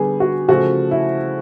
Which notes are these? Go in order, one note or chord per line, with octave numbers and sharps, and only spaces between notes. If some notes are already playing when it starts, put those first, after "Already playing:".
Already playing: D3 G3 B3 G#4
F#4
C#3 F3 A3 F#4
E4